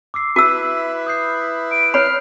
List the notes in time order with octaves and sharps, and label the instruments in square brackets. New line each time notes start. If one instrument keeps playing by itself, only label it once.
[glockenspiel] D6 E6 C7
[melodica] E4 B4 E5 [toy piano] F#4 E6 [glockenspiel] D#7
[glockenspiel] D#6 G6 C7
[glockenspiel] B5 [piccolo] D7
[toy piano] C#5 B5 [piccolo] F6 [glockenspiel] C7